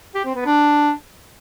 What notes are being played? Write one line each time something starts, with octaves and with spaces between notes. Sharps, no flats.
G4
C4
B3
D4